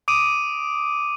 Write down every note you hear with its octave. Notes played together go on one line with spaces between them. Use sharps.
D6 D#6 D7 D#7